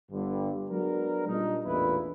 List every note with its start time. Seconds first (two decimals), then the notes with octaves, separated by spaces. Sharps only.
0.12 G1 G2 D3
0.70 F#3 G#3 B3 D4 A#4
1.28 A#2 G3 D4 D#4
1.66 A1 E2 A#2 D4 E4 B4